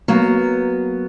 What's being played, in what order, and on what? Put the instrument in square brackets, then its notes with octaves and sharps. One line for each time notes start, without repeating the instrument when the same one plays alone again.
[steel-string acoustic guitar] F#3 A#3 B3